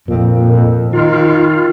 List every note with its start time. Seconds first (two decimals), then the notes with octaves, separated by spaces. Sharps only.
0.08 F2 A#2
0.93 D#3 F4